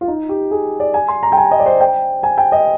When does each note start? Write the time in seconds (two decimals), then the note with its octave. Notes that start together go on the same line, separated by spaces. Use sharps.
0.01 F4
0.08 D#4
0.29 G4
0.51 G#4
0.80 D5
0.94 G#5
1.08 C6
1.23 A#5
1.32 G5
1.37 G#5
1.51 D#5
1.59 D5
1.66 C5
1.80 G5
2.23 G#5
2.38 G5
2.52 D#5